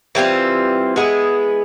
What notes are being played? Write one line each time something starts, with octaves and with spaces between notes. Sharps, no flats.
E3 G3 C4 F4
G#3 B3 E4 G#4